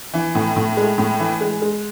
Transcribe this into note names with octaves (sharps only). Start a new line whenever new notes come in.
E3
A2
A2
G#3
A2
E3
G#3
G#3